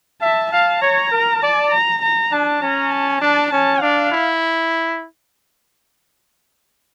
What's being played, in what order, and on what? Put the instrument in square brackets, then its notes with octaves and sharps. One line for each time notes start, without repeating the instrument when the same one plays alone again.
[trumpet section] E5 [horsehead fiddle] A5
[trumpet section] F5 [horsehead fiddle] A5
[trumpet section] C#5 [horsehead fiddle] A#5
[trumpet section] A#4
[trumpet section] D5 [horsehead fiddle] A5
[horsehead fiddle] A#5
A#5
[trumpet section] D4 [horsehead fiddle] A5
[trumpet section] C#4 [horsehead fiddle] A#5
[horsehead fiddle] A5
[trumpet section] D4 [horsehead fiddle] A5
[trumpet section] C#4 [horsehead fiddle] A5
[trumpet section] D4 [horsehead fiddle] F5
[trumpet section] E4